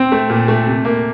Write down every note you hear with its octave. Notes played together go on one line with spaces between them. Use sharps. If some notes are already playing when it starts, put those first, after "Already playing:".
Already playing: C4
A3
A#2
A3
C3
A#3